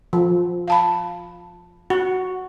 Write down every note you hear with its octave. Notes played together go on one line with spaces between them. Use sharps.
F3
F5 A5 B5
F#4